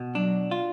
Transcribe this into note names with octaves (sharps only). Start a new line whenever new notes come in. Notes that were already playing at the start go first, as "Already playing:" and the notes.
Already playing: B2
F#3 D4
F4